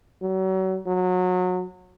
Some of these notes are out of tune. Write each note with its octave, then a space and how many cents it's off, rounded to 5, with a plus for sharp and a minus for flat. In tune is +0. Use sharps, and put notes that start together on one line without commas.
F#3 +35
F#3 -25